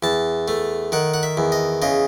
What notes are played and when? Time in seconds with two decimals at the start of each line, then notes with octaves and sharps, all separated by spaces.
0.03 E2 A5
0.48 A3
0.92 D#3 F#5
1.14 F#5
1.23 E5
1.37 E2
1.52 D#5
1.82 C#3 D#5